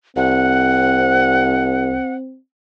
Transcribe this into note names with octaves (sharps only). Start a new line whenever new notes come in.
C2 C4 F#5